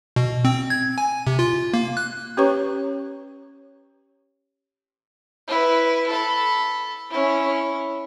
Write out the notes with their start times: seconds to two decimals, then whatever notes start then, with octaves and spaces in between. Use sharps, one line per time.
0.16 B2
0.45 C4
0.70 G#6
0.98 G#5
1.27 C3
1.39 F4
1.73 A#3
1.97 F#6
2.37 C#4 G4 B4 C#5 A#5 C#6
5.48 E4 B4
6.08 A4 B5
7.11 C#4 E4